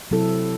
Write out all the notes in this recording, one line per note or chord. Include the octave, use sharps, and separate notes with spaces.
C3 F#3 C4 E4 A4